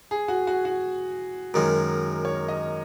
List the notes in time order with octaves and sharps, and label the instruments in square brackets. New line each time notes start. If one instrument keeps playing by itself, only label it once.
[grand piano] G#4
F#4
F#4
F#4
[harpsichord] F#2 D#3 G#3 [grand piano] A#4
[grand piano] C#5
D#5